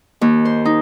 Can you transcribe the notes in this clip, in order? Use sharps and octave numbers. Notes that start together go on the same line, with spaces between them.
D#2
C5
D#4